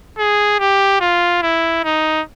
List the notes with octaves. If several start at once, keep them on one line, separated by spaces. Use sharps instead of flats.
G#4
G4
F4
E4
D#4